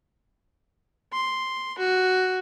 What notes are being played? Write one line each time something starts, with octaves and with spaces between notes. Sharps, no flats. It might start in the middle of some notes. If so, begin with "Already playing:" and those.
C6
F#4